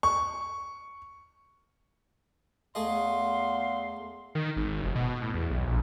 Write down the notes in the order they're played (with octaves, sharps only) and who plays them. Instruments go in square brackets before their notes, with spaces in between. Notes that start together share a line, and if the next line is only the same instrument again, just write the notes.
[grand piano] C#6
[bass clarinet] E2 [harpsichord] A3 G#4 D#5 [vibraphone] F5 [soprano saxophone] C6
[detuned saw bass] D#3
G#1
F1
B2
A2
E2
B1
A#1